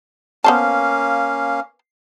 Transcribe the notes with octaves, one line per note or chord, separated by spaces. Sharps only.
A#3 B3 C#4 C5 F5 A5